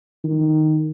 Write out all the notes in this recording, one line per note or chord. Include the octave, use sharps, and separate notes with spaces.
D#3